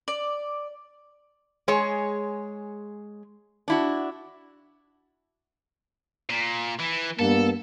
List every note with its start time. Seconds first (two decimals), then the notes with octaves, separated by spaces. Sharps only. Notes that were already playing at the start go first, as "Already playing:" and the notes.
0.08 D5
1.68 G#3 G#4 C#5
3.68 D4 E4 F#4
6.29 A#2
6.80 E3
7.19 G2 A#3 B3 A4